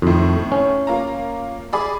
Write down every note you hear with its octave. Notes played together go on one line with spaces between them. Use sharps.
F2 A2 D#3
C#4
A#3 F4 A#5
G#4 D5 B5